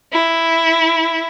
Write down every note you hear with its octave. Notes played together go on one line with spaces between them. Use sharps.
E4